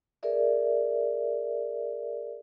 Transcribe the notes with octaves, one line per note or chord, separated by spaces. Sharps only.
G#4 A#4 B4 D5 E5